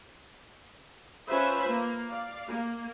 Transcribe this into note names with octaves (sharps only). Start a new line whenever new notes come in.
C#4 F4 B4 C5 E5
A#3
D5 F5
A#3